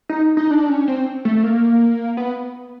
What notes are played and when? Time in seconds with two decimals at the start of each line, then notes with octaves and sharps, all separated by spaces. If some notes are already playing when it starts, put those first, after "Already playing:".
0.09 D#4
0.37 D#4
0.51 D4
0.69 C#4
0.88 C4
1.25 A3
1.44 A#3
2.17 B3